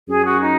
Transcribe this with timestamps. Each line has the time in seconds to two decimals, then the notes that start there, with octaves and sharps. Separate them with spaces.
0.09 F#2 G#4
0.25 F#4
0.41 D#4